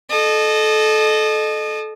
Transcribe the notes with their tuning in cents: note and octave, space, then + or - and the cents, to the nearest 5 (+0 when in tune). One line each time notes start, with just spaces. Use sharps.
A4 -25 D#5 -30